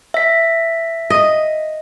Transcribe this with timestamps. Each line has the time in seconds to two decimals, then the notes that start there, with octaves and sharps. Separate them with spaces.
0.14 E5 B6
1.10 D#5